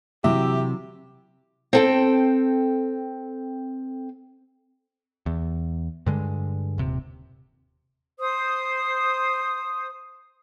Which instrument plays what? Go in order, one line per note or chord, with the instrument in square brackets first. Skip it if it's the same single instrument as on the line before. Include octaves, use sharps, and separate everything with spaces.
[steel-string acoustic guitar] C3 [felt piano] E3 F#3 D6 [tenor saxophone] G4 [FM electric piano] E5
[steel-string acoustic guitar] C4 A4 G5
[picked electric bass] E2
G2 D3 G#3
D#1 C3
[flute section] C5 D#6